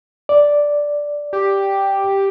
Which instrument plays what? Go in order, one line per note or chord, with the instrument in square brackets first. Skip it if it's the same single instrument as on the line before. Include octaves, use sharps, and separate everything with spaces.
[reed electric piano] D5
[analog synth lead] G4